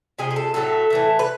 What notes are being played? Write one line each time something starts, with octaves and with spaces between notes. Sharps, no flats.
C3 F3 G#3 G#4
G#4
A4
A2 F#3 A3 A4
A2 E3 A3
B4